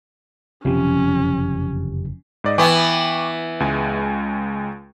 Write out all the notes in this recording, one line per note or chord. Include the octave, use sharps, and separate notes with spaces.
F#1 F2 C3 E3 F3 C#4 G4
G#2 D5 D#5
E3 B3 G5 C#6 D6
C#2 G#3 G#5